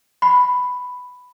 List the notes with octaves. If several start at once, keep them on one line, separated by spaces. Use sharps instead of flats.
B5